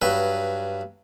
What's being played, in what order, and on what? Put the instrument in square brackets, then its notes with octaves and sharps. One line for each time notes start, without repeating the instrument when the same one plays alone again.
[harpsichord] G2 F#3 B4